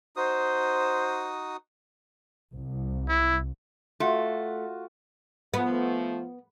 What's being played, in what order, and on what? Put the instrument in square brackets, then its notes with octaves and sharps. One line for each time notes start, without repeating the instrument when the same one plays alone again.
[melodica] D#4 F#4 D#6 [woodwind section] C5
[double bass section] C2
[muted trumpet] E4
[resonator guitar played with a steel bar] A3 [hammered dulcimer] F4 F#4 F#5
[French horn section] F3 A3 [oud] B3